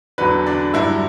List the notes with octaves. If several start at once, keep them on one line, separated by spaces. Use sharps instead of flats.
E2 D3 F#3 B4
D4 D5
G2 D3 F#3 E4 E5